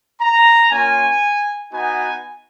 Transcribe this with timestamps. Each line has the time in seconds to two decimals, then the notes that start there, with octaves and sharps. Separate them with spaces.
0.20 A#5
0.71 A#3 C#4 F4 G#5
1.72 B3 D#4 F#4 G#5